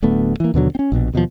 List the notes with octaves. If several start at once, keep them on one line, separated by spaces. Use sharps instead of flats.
D1 D2 A3 B3
E3 A#3
D#2 B2 D3 F#3
C4 C#4
A#1 B2
D#2 B2 D#3 F3